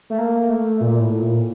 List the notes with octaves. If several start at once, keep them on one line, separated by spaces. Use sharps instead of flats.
A3
A#3
A3
A#2
A2
A#2